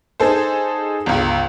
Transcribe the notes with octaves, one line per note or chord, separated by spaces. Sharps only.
D#4 G#4 A4 C5
G1 C#2